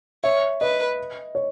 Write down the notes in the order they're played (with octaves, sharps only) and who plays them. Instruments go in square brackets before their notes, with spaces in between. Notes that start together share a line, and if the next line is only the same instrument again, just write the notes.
[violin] C#5 [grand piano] E5
[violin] B4 [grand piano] D#5
[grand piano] C#5